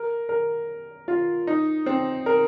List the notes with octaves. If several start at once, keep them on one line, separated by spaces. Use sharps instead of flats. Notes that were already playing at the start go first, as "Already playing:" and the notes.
Already playing: A#4
A#4
F4
D#4
C4
A#4